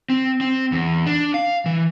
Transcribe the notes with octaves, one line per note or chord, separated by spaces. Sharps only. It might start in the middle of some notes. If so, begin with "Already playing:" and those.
C4
C4
E2
D4
F5
E3